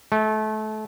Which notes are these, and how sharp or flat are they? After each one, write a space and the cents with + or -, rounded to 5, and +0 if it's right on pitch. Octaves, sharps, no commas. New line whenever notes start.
A3 -25